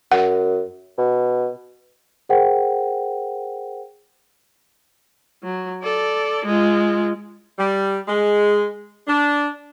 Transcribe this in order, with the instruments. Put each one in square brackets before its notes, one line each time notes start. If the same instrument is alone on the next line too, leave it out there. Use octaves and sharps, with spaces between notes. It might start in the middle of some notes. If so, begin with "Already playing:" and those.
[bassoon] F#2 [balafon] F#5
[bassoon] B2
[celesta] G#4 A#4 C5 F#5 G5
[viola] F#3
A4 D5
G#3 F4
[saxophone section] G3
G#3
D4